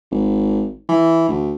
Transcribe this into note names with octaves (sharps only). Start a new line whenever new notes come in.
G#1
E3
D2